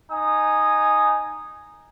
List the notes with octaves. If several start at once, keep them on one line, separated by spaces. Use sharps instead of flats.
D#4 G#5 D#6